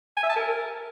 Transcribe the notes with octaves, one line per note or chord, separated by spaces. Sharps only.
G#5
E5
A5
A#4